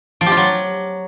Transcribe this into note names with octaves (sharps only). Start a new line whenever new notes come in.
F3
G4
F4
F#3